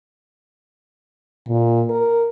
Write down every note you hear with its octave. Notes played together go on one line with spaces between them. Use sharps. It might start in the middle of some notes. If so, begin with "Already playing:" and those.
A#2
A#4